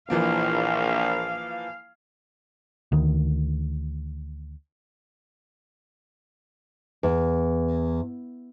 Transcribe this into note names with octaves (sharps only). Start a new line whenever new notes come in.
A#1 E3 F3 A#3 F5
D2 D#3
E2